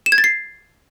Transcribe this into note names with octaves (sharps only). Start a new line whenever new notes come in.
E7
G#6
A6
C7